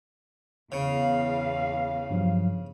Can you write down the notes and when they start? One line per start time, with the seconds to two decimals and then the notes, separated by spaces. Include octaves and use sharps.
0.72 E2 C#3 F5
2.10 G2 F3 F#3